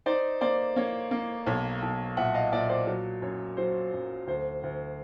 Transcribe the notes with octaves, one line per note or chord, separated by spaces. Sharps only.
D#4 C5 D5
A#3 C5 D5
A#3 C#5
A#3
B1 C#5
B1
A#2 E5 F#5
D#5 F5
A#2 D5 E5
C5 D5
F#3 C#5
F#2 C#5
F#3 C5
F#2
D2 C5
D2